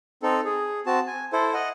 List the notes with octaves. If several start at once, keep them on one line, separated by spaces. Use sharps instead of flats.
C4 D#4 A4
G#4
C4 F#4 A5
G#5
E4 A4 C5
D#5 F#5